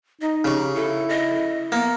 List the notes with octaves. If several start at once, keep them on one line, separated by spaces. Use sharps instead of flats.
D#4 D#5
C#3 G4 C#6
E4 A4
D#5
A#3 B3